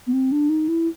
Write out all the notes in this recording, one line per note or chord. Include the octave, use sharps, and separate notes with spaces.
B3
C4
D4
D#4
E4